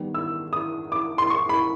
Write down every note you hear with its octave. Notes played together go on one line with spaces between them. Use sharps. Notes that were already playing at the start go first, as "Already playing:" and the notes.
Already playing: D#3 G3 B3
E6
D#6
D6
C6
C#6
B5